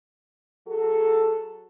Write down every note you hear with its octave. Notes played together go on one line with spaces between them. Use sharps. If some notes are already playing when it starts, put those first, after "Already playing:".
F#3 F#4 G#4 A4